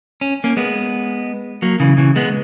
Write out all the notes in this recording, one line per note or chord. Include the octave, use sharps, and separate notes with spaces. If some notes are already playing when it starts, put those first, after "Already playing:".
C#4
A#3 C#4
G#3 B3
F#3 A#3
C#3 E3
C#3 E3
G#3 B3